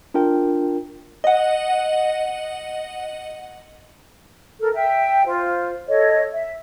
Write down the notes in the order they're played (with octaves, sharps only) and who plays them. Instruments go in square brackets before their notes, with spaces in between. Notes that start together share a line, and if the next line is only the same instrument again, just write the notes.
[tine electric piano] D4 F4 A#4 G5
[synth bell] D#5 F#5
[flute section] A4 A#4
E5 G5
F4 C5
A4 C#5 D#5
E5